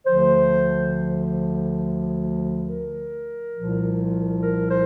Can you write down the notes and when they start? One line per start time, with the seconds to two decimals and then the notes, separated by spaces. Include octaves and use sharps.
0.06 D2 D3 F3 C5
2.67 A#4
3.54 C2 A#2 F3
4.42 A#4
4.70 C5